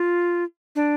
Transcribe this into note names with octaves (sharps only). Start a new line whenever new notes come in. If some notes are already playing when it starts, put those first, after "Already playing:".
Already playing: F4
D4